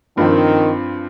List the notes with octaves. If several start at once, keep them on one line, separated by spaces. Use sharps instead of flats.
G2 D#3 F3 C4